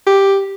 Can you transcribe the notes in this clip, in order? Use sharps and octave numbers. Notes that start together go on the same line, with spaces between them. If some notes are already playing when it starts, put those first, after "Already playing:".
G4